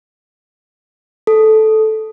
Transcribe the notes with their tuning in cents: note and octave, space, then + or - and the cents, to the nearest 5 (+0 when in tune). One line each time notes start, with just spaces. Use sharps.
A4 -10